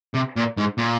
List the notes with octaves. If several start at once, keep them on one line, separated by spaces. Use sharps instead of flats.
C3
A#2
G#2
A#2